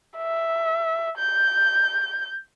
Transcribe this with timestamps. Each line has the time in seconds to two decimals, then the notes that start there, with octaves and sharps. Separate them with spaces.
0.17 E5
1.18 G6